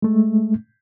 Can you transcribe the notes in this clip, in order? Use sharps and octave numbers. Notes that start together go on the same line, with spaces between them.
G#3 A3